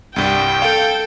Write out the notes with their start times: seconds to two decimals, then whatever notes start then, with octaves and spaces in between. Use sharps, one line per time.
0.16 C2 G2 G3 G5
0.62 A4 F5 D7